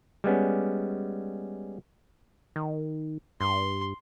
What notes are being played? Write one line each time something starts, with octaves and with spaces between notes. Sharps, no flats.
G3 G#3 B3 C#4
D#3
G2 C6